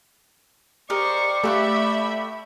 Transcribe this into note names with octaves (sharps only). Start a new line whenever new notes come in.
G4 A#4 C5 D5 D#5 C#6
A3 G4 A4 B4 E5 F5 B5 C#6